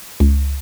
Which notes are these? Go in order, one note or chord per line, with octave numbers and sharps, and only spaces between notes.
C#2